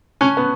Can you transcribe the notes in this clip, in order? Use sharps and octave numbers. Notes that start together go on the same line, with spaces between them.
C#4 A5 C#6 F#6
B3